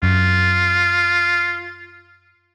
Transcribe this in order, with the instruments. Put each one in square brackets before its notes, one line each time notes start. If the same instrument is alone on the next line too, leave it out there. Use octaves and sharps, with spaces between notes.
[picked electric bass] F#2 [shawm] F4